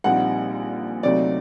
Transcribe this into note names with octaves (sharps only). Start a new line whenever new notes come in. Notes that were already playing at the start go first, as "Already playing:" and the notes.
A#1 A#2 G3 C4 D#4 F#5
D2 C3 F#3 C4 D#4 D5